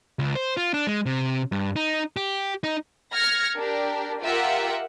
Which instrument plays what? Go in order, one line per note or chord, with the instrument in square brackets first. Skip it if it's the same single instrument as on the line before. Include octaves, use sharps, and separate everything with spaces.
[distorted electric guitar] C#2
C5
F4
D4
G#3
C3
G2
D#4
G4
D#4
[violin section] F6 G#6 A#6 C#7
D4 G4 A#4
F4 G4 A#4 E5 F#5